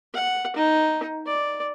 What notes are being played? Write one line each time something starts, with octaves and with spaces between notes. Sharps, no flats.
F#5
D#4
D5